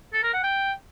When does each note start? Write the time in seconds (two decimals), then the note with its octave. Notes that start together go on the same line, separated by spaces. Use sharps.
0.13 A4
0.23 A#4
0.33 F#5
0.44 G5